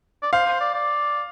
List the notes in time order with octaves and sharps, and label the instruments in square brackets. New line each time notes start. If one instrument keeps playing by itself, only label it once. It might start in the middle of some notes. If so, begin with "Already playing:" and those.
[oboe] D5
[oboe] C5 [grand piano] F5
[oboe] C5
D5
D5